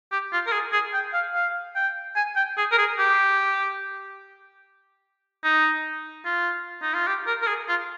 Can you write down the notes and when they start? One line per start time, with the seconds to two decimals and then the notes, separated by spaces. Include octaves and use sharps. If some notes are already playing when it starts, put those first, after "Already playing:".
0.12 G4
0.33 F4
0.47 A#4
0.52 G#4
0.73 G#4
0.93 G5
1.14 F5
1.35 F5
1.76 G5
2.16 G#5
2.36 G5
2.58 G#4
2.72 A#4
2.78 G#4
2.99 G4
5.44 D#4
6.25 F4
6.82 D#4
6.94 F4
7.07 G4
7.27 A#4
7.42 A#4
7.47 G#4
7.68 F4